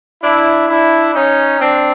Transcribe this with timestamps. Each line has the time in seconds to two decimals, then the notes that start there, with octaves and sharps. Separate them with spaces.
0.23 D4 E4
0.69 D4 E4
1.14 C#4 D#4
1.59 C4 D4